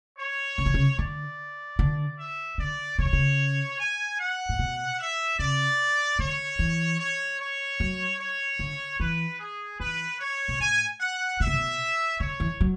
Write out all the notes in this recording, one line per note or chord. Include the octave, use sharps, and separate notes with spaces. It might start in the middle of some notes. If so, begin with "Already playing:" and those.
C#5
C#3
D3
C#3
D3 D5
D3
E5
D3 D5
C#3 C#5
D3
C#3
G#5
F#5
A2
B2
E5
C#3 D5
D3 C#5
E3
C#5
C#5
F#3
C#5
D3
E3 B4
G#4
E3 B4
C#5
B2
A2 G#5
F#5
B2 E5
C#3
B2
D3 C#5
E3
F#3